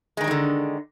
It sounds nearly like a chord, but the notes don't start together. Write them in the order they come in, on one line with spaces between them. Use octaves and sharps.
G#3 D#3 D#4 G3 D3